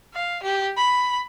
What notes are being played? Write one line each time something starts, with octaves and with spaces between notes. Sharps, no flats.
F5
G4
B5